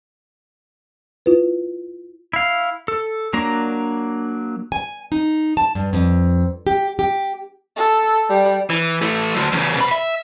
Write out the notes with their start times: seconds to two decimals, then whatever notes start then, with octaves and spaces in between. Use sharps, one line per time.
1.26 E4 F4 B4
2.33 E4 F5
2.88 A4
3.33 F#3 A#3 D4 A#5
4.72 G#5
5.12 D#4
5.57 A5
5.75 G2
5.93 F2
6.67 G4
6.99 G4
7.76 A4
8.29 G3
8.70 E3
9.02 E3 A3
9.36 D2 F#3
9.52 E2 C#3
9.76 B2 B5
9.91 E5